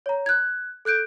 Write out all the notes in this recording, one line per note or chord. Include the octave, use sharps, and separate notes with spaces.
C#5 A#5
F#6 G#6
A4 F#6 G6 D7